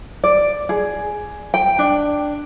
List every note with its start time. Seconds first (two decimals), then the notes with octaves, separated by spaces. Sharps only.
0.24 D5
0.69 G#4
1.54 G5
1.79 D4